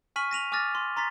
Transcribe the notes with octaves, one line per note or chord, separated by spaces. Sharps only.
G#5 C#6 F6 B6 D#7 F#7
A#6 D#7 F7 F#7
G#5 D6 E6 F6 A6 A#6
C6
A#5 C6 A6 B6